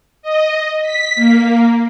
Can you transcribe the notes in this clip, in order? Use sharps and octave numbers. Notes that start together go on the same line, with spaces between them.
D#5
B6
A#3